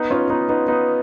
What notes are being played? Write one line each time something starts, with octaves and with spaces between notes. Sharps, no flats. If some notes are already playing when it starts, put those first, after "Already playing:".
Already playing: B3 D#4
C#4 F4
B3 D#4
B3 D#4
B3 D#4